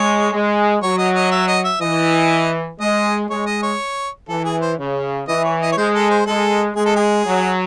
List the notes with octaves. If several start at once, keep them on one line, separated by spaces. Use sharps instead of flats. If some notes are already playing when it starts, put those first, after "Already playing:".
Already playing: G#3 C#5
G#3
F#3 C#5
D#5
D#5
E5
D#5
E5
E3 D#5
G#3 D#5
G#3 C#5
D#5
C#5
E3 A4
G#4
C5
C#3
E3 D#5
C#5
D#5
C#5
G#3 C5
A4
C5
G#3 A4
G#3 G#4
A4
G#4
F#3